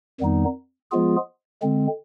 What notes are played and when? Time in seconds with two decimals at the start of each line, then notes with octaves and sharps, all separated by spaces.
0.20 F2 D#3 G3 B3 D#4
0.91 F3 G#3 B3 F4 G#4
1.62 D3 G#3 C4